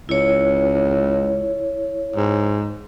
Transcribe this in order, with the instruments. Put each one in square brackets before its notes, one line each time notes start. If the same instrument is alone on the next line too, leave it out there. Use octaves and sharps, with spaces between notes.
[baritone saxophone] C#2 [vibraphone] E4 C#5
[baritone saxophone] G#2